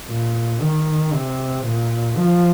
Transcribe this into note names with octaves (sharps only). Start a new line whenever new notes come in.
A#2
D#3
C3
A#2
F3